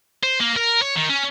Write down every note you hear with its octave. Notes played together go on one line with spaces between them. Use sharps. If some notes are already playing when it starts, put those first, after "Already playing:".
C5
A#3
A#4
C#5
D#3
C#4